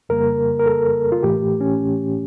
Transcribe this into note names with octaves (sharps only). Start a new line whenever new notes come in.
F2 C#3 G3 A#3 A#4
A#4
A4
F4
A2 E3 A3 G4
C#4